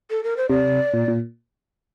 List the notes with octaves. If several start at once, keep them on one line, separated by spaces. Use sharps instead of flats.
A4
A#4
C5
C3 D5
A#2
A#2